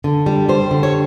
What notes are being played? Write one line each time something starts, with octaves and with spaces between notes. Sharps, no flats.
D3
G3
G3 C5
D3
C#5